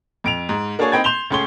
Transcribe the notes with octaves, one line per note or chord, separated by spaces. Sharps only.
F2 D7 F7
G#2
A#3 D4 F#4 G#4 C#5 G#5
C4 D#4 G5 B5 G#6
C6 G6 E7 F7 G7
C#2 A3 C#4 G#4 C6 G7